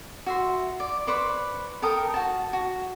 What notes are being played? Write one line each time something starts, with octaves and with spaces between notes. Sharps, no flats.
F#4 E5 C6
D5
B4 C5 D5 C#6
A4 A#4 G5 D#6
F#4 A5
F#4